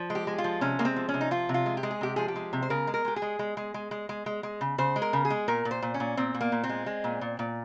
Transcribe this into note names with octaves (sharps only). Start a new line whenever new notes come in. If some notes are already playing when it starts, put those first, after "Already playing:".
Already playing: F3
G#3
G4
G#3
F4
F3
C3 C#4
G#3 A#3
C4
F3
C#4
C3
D#4
F3 F4
C3
F4
G#3
G4
G#3
G#4
C3 G4
F3 G#4
G4
G#3
C3
C5
C#3 A#4
G#3
A#4
G#3 G4
G#4
G#3
G#3
G#3
G#3
G#3
G#3
G#3
G#3
C#3
C#3 C5
G#3
A#4
C#3
G#4
G#3
A#2 A#4
A#2
C5
A#2
C#4
A#2
A#2 C4
A#2
A#3
A#2
C4
G#3
G#3
A#2
A#2
A#2